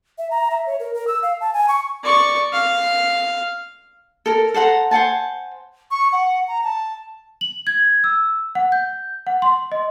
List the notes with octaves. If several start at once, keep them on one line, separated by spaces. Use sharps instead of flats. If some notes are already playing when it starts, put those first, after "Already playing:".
E5
A#5
E5
C#5
A#4
A#4
E6
F5
A5
G#5
C#6
D5 C#6
F5
A4 A#4
A4 C5 F#5 A#5
C5 F#5 G#5 A5
C#6
F#5
A#5
A5
F#7
G#6
E6
F#5
G6
F#5
C6
D#5